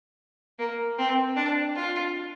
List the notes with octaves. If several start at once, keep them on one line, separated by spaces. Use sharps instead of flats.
A#3
C4
D4
F4